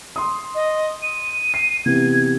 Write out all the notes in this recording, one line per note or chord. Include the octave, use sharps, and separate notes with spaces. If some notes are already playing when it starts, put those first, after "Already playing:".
C6 D#6
D#5
D#7
C7
C3 E3 B3 G#6